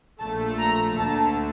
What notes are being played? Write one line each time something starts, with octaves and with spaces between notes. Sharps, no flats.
A#1 A#2 A3 A5
A#5
D2 D3 A3 A5